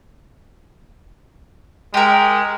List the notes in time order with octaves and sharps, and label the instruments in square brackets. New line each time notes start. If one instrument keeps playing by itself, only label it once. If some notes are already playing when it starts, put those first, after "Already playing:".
[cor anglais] G#3 [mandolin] G4 A#4